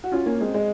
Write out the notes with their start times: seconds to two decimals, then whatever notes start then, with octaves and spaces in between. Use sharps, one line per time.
0.04 F#4
0.12 C#4 F4
0.26 A#3 C#4
0.41 G#3 C4
0.54 G#3